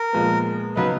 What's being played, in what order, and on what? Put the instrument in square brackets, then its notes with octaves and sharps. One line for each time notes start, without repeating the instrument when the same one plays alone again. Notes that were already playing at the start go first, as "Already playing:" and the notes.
Already playing: [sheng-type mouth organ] A#4
[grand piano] A#2 F3 G#3 B3
[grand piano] C#3 F#3 B3 D#4 [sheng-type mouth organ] B4